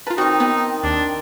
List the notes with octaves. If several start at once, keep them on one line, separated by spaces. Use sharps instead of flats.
F4 A#4 B4 A5
D#3 C4 D#4 F#4 C#6
B3
D#2 D4